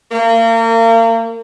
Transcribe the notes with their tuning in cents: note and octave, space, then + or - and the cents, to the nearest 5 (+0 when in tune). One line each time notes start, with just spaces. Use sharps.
A#3 -35